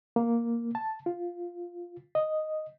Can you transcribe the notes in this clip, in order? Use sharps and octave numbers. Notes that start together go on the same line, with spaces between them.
A#3
A5
F4
D#5